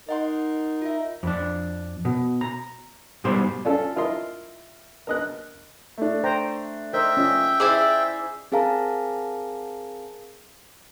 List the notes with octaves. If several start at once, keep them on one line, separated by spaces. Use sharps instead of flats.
D#4 A#4 D#5 F#5 C6
F4 E5
F2 D4
B2
A#5
G#2 B2 G3 C5
C#4 D4 F4 A4
E4 F4 A#4 D#5 C6
A#4 D#5 F#6
A3 D4
C5 G5 A#5
A#4 C5 D#5 E5 G5
C#4 F4 D#5
E4 G#4 C5 D5 D#5 E6
C4 G#4 A#4 F5 A5 A#5